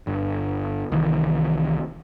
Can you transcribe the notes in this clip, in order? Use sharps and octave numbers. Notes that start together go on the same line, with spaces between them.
G1
C2 D#3 E3